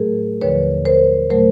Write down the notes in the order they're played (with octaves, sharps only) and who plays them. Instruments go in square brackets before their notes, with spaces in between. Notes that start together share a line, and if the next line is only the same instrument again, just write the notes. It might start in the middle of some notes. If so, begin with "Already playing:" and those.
Already playing: [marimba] A2 F#3 A3 G#4 A#4
D#2 D3 F3 B4 C#5
A#4 C5
A#2 F#3 A3 A#4 C5